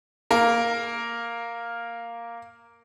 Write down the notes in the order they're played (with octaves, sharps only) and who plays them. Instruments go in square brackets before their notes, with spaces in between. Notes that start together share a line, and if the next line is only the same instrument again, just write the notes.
[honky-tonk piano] A#3 A#4